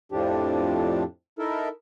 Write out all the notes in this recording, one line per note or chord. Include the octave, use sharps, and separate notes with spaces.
F2 A2 F3 D4 G4
D#4 E4 A4 A#4